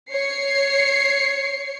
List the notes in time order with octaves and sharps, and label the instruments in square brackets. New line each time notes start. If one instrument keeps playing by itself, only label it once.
[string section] C#5 C7 C#7